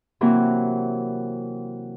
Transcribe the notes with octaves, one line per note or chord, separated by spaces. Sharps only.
C3 E3 F#3 A#3 C4 F#4